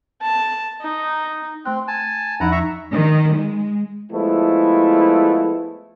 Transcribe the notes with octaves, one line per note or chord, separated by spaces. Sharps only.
A5
D#4
A3 C4 F#6
G#5 A5
E2 F3 D#4 E4 F#5 A#5
E5 A#5 C#6
D#3
G#3
F3 G#3 A3 B3 E4